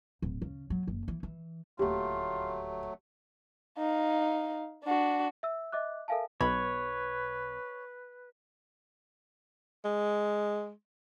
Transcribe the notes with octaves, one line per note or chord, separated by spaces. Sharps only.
D1
C#3
F#3
F#1
E3
E3
D#1 D2 F#3 A3 F4 G4
D#4 F5
D4 F#4
E5 E6
D#5 E5 D6 F#6
A4 A#4 E5 F5 G#5 A5
B1 B2 B4 C#5 B5
G#3